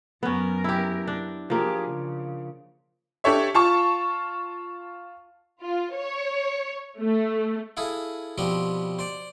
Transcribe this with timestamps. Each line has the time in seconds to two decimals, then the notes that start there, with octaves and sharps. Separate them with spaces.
0.23 F#2 B3 C#4 A#4
0.64 E4 G4
1.08 D4
1.50 F3 A#3 G4 G#4
1.88 C#3
3.24 D4 G4 A4 C#5 E5
3.54 F4 A5 C#6
5.61 F4
5.94 C#5
6.99 A3
7.77 E4 G#4 A4 F5
8.38 B2 F3 G3 B3 C4
8.99 C5 D5